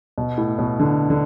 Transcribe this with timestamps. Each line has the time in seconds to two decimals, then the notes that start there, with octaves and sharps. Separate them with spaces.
0.18 B2
0.38 A2
0.59 B2
0.80 D3
1.10 D3